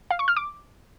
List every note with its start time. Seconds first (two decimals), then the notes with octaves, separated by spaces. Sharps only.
0.11 F5
0.19 C#6
0.28 F6
0.36 D6